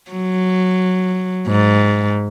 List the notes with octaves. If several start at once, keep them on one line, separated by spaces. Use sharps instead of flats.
F#3
G#2